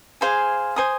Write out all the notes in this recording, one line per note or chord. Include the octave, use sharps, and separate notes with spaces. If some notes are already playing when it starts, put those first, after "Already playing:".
G#4 C5 F5 G#5
C5 G#5 D#6